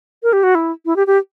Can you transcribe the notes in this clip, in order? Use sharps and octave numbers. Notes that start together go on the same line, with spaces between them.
A#4
G4
F#4
E4
E4
G4
G4